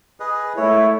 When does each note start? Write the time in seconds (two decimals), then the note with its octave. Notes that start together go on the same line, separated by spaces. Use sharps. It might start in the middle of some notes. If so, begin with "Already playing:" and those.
0.20 G#4 B4 D#5
0.56 A3 E4 C#5